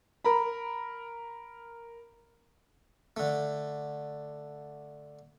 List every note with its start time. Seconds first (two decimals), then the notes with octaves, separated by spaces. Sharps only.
0.25 A#4 A#5 B5
3.17 D3 A3